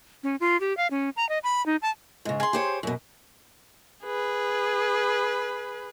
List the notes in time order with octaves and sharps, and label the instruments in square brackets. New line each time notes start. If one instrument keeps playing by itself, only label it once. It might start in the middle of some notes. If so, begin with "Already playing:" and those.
[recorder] C#4
F4
G4
F5
C#4
A#5
D#5
B5
D#4
A5
[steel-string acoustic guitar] G#2 C#3
[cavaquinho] G#4 C6
[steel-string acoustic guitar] G4 C5 C#5
F#2 B2
[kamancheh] G#4 B4